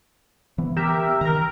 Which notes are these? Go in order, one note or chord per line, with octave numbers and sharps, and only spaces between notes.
E3 B3
G4 A#4 E5
D#3 A#4 A#5